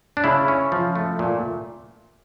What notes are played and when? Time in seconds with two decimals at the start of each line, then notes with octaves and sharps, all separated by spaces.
0.17 D4
0.24 C#3 E4
0.48 C#4
0.72 F3
0.96 A3
1.19 A#2